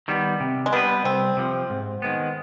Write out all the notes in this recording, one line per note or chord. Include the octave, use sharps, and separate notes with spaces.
D#3 G3 B3
C3
G#3
G3 B3 D4 G4 B4
C2 C4
C3 F3
G#2
D#3 G#3 B3